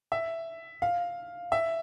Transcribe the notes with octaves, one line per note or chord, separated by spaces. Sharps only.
E5
F5
E5